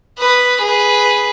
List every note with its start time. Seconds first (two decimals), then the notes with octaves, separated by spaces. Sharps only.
0.18 B4 D#6
0.61 G#4 B4